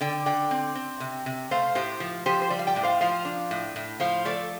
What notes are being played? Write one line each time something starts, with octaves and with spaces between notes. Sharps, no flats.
D3 D5 G5
D3 D5 G5
C4
C4
C3
C3
A3 C5 F5
A2 G4 C5
F3
F3 G4 C5
C5
G3 D5
F5
D5 G5
A2
C5 F5
F3 C5 F5
D4
A2
A2
F3 C5 F5
A3 A4 D5